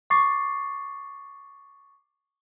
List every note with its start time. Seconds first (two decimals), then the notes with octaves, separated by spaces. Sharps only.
0.10 C#6 D6 A6 C7